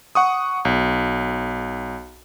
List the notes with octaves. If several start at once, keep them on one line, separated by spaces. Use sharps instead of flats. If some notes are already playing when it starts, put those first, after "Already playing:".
F#5 C#6 D#6
B1